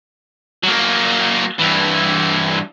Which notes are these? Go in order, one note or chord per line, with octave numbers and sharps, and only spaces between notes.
F#3 A#3
G2 E3